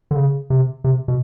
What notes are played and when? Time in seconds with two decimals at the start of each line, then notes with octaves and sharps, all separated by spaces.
0.11 D3
0.16 C#3
0.50 C3
0.84 C3
1.08 B2